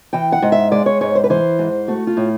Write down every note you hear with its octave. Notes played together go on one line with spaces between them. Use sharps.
E3 G5
F#5
G#2
E5
G#3 D5
C#5
G#2 C#5
C5
B4
E3 C5
G#2
A3 F#4
F4
A2